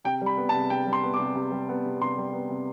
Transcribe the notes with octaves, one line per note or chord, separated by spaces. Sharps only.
C3 G5
G3
B5
B3
A5
C3
C3 G5
G3
C6
B3
D6
C3
C3
G3
B3
C3
C3 C6
G3
B3
C3